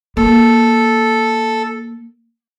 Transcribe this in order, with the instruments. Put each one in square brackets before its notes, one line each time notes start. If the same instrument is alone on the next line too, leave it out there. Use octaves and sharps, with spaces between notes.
[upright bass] A#3 [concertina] A4